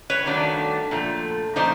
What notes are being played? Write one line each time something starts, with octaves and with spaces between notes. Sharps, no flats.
B4 C#5
G2 D#3 F#3 A3 D4
A#2 F3 A3
C#3 F3 A#3 D#4 C5 D5